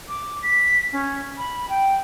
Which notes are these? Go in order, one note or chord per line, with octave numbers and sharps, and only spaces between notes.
D6
B6
C#4
B5
G5